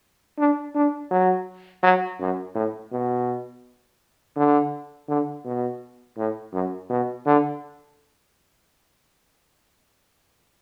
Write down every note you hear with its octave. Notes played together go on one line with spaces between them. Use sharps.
D4
D4
F#3
F#3
F#2
A2
B2
D3
D3
B2
A2
F#2
B2
D3